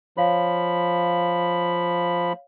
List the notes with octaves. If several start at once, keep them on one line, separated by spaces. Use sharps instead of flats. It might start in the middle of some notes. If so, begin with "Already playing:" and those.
F3 C#5 F5 B5